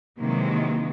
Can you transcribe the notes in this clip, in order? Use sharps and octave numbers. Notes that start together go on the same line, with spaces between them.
C3 D#3 E3 F#3 G#3 A#3